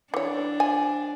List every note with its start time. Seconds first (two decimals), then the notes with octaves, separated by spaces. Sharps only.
0.14 E3 D4 C#5
0.60 F3 G#5